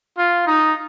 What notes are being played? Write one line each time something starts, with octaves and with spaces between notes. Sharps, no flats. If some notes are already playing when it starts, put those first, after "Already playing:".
F4
D#4